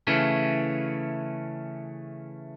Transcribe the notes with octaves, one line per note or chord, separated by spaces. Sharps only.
C#3 E3 A3 C#4